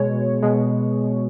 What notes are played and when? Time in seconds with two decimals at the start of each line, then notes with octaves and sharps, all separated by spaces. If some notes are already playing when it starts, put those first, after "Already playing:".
Already playing: B2 G#3 C#5
0.43 B2 G#3